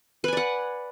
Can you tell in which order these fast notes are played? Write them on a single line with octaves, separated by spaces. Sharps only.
B4 G#5 D5 F#5